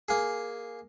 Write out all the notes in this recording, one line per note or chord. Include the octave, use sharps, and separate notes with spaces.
A#3 G#4